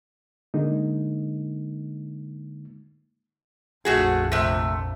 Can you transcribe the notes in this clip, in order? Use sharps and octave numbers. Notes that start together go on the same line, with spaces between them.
D3 G#3 A#3 D#4
A#1 F2 A3 F#4 G#4
C3 A3